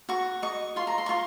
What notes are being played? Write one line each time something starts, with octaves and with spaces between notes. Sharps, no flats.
F#4 C#6
D#5 C#6
F4 C6
A#5
C6
C#6
F4 C6